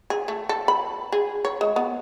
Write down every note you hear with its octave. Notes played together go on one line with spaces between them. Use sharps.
G#4
A3
A4
B5
G#4
C#5
G#3
B3